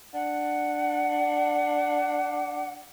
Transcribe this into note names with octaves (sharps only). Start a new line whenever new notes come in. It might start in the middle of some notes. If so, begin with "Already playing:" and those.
D4 F#5